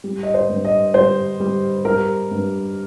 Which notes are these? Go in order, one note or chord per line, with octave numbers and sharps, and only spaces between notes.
G3
D#5
C5
G2
D#5
G3 C5
G3
G3 A#4
G2